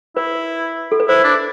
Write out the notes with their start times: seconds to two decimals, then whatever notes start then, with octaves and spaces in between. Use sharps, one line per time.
0.16 E4 B4
0.92 A4
1.00 B4
1.08 E4 C5
1.24 D4